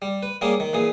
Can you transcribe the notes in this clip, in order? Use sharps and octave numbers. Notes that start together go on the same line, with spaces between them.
G3
B4
G3 A#3 C#4 G#4
D#3
A#2 E3 G#4